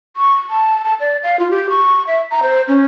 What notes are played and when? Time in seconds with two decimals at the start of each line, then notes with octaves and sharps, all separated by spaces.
0.17 C#6
0.50 A5
0.84 A5
1.00 D5
1.23 F5
1.39 F4
1.51 G4
1.70 C#6
2.07 E5
2.31 A#5
2.43 C5
2.68 C#4